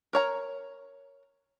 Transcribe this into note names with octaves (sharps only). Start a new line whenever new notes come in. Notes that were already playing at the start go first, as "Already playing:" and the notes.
A#4 C#5 A#5